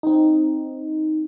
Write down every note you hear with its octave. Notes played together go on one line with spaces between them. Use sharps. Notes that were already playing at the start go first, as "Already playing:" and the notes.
C4 D#4